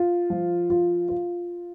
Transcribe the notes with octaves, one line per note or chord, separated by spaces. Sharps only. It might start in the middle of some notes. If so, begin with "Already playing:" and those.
Already playing: F4
F3
F4
F4